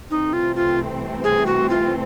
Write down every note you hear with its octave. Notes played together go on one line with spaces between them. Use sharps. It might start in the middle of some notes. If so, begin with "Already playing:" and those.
C2 C3 E3 A3 C4 D#4
F4
F4
G#4
F#4
F4